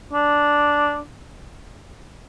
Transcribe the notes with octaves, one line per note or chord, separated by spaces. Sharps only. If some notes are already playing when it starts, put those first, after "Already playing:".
D4